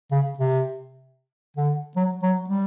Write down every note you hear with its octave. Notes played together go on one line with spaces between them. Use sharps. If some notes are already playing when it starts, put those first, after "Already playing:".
C#3
C3
D3
F#3
F#3
G3